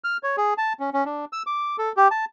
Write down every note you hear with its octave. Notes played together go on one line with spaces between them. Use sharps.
F6
C#5
G#4
A5
C#4
C#4
D4
E6
D6
A4
G4
A5